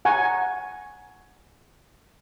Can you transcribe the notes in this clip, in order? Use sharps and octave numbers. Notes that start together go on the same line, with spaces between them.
F#5 G#5 A#5 C#6